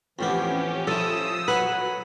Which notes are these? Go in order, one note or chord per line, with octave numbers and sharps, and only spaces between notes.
F2 A2 E3 B3 C#4 G4
F3 C#4 E4 A4 D#6 E6
F#3 B4 F#5 G#5